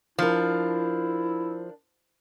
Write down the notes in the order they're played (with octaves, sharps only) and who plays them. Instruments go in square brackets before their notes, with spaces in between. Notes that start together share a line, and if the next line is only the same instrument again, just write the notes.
[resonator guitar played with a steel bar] F3 [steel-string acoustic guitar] D4 A#4 [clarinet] E4